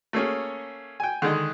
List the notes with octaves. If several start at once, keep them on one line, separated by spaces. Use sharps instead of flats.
A3 A#3 C#4 G#4
G5 G#5
D3 D#3 G#3 D#4